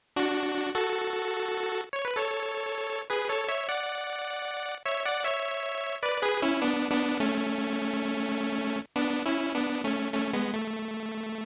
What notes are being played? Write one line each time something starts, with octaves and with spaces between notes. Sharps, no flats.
D4 F#4
F#4 A4
C#5
B4
A4 C#5
G#4 B4
A4 C#5
C#5 E5
D5 F#5
C#5 E5
D5 F#5
C#5 E5
B4 D5
G#4 B4
C#4 E4
B3 D4
B3 D4
A3 C#4
B3 D4
C#4 E4
B3 D4
A3 C#4
A3 C#4
G#3 B3
A3